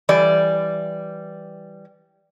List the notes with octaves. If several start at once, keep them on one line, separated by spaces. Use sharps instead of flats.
E3 G3 D5